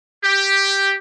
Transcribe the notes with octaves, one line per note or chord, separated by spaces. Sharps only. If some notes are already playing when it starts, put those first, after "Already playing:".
G4